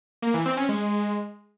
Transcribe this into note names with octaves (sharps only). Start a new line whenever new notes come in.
A#3
E3
C4
C#4
G#3